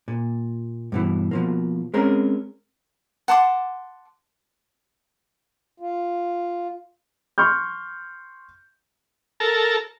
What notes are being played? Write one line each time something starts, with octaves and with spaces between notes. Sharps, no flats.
A#2
G2 B2 E3
B2 F3 A#3
G#3 C4 C#4 A#4
F#5 A5 C6 D6
F4
C6 C#6 F6 G6
A4 A#4